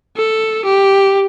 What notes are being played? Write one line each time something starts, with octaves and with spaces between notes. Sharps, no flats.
A4
G4